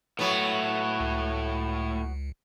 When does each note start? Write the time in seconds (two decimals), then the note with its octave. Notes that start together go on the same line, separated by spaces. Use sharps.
0.19 A2 F#3 A3 B3
1.00 C#2